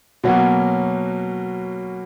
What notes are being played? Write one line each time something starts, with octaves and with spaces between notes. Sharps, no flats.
B2 F#3 A#3 C#4 F#4